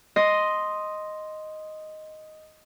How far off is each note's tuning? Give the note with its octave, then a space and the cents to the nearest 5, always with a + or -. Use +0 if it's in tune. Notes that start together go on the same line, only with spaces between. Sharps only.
D#5 +0 C6 +0